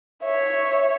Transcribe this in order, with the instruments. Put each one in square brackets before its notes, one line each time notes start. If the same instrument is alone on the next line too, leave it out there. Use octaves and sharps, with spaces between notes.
[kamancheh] C#5 E5